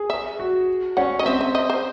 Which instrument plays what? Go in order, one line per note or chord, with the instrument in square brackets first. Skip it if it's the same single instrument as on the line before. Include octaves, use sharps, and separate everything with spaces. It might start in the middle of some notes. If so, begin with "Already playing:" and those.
Already playing: [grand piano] G#4
[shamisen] E5
[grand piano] F#4
[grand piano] C#4 [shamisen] F#5
[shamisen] D#5
[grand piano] C4 [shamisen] E5
[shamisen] E5
D#5
C5